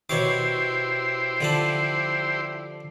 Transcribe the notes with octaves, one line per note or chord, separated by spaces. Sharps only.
B2 E4 G4 C5 C#5 D6
D3 F3 A5